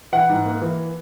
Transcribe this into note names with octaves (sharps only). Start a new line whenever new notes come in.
E3 F#5
G#2
A#3
E3